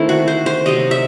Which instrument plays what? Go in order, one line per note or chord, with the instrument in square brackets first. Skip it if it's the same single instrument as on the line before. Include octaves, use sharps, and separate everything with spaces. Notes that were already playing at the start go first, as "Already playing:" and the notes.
Already playing: [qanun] D#3 A3 C4 E4
F#4
C5
C5
C3 F#3 C4 D#5
E5